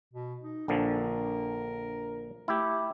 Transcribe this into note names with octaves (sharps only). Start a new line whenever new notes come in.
B2
D#4
A#1 D3 F3 A#4
A3 E4 G4